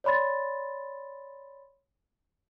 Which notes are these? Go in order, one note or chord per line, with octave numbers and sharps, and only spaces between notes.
C#5 D5 B5 C6 A6